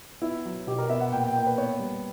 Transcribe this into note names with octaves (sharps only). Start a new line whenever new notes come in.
B3 E4
F#3
B2 G4
A#4
B3 E5
F#5
A#2 G5
G5
A#3 G5
B4
B3 C#5
G3